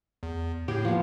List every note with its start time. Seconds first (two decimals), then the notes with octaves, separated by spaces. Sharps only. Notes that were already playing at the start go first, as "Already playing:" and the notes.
0.23 E2
0.68 A2 G4 G#4
0.85 F3 B3